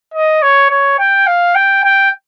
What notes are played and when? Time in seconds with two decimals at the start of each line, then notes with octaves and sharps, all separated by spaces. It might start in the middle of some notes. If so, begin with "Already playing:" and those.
0.14 D#5
0.42 C#5
0.70 C#5
0.99 G5
1.27 F5
1.55 G5
1.84 G5